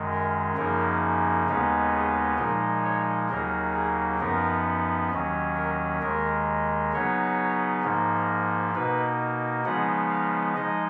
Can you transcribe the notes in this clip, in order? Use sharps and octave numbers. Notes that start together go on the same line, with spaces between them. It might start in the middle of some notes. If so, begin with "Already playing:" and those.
Already playing: F#2 D#3 G#3
A#4
F#2 C#3 F3 A#3 D#4 A#4
D#2 C#3 G#3 B3 D#4
G#4
A#2 F3 G#3 D#4 A#4
C#5
D#2 C#3 F#3 A#3 D#4 A#4
G#4
F#2 F3 B3 D#4 A#4
D#2 D#3 F#3 C#4
A#4
D#2 D#3 G#3 A#4
C#3 F#3 B3 D#4 C#5
G#2 F3 A#3 D#4
B2 A#3 D#4 B4
C#3 F3 G#3 B3 D#4 F#5
F5
F3 G#3 D#4 D#5